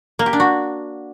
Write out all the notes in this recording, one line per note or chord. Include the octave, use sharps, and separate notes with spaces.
A#3
G4
D4
F#4